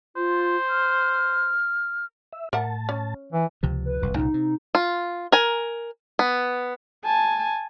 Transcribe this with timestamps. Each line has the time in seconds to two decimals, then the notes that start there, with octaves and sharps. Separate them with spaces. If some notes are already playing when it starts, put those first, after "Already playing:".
0.16 F4 C5
0.70 F6
2.33 E5
2.53 A2 A#4 E5 F#5 A5
2.89 C#4
3.33 E3
3.63 C#2 C3 F3
3.85 B4
4.01 D#1 C2 F#2
4.16 C2 A#2 C#3 D#4
4.34 C3
4.75 F4
5.32 A#4 G#5
6.19 B3
7.04 G#5 A5